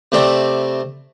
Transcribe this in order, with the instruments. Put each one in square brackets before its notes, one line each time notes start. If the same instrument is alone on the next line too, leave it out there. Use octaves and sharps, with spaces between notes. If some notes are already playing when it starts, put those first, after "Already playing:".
[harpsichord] C3 A3 C4 D5 B5